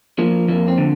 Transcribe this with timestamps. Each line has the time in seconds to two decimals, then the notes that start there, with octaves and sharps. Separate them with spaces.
0.19 F3 A#3
0.48 F2 A#3
0.68 C4
0.78 D3